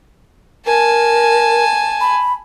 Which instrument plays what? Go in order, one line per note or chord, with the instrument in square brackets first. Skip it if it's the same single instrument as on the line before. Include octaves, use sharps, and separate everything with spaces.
[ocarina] A#4 [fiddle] G#5 A5
[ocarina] B5